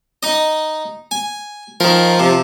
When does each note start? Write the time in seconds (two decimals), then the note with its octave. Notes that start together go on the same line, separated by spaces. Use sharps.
0.23 D#4 D#5
1.11 G#5
1.80 D#3 F3 A#4
2.20 C3